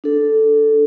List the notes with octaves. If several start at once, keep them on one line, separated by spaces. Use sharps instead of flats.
D4 A4